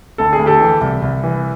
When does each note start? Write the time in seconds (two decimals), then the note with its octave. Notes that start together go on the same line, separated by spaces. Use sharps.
0.18 D2 A4
0.33 G#4
0.39 D2
0.46 G4 A4
0.61 E3
0.81 C2
1.02 C2
1.24 E3